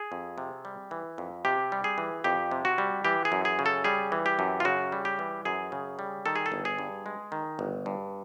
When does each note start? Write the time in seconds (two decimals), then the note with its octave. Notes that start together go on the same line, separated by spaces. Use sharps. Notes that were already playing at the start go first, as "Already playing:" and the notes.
Already playing: G#4
0.12 F2
0.38 C3
0.65 G3
0.91 E3
1.18 F2
1.45 C3 G4
1.72 G3
1.84 G#4
1.98 E3
2.24 F2 G4
2.51 C3
2.65 F#4
2.78 G3
3.05 E3 G4
3.25 G#4
3.32 F#2
3.45 G#4
3.59 C#3
3.66 A4
3.84 G3 G#4
4.12 E3
4.26 G4
4.39 F#2
4.60 F4
4.65 C#3 F#4
4.92 G3
5.05 G4
5.19 E3
5.45 F#2 G#4
5.72 C#3
5.99 G3
6.26 D#3 A4
6.36 G#4
6.46 A4
6.52 G1
6.65 G#4
6.79 G2
7.06 G#3
7.32 D#3
7.59 G1
7.86 G2